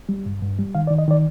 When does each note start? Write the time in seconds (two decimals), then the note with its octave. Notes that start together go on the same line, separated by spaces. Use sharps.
0.09 G3
0.26 G2
0.42 G2
0.59 G3
0.75 D#3 F5
0.87 D5
0.90 D#3
0.98 D#5
1.08 D#3 D5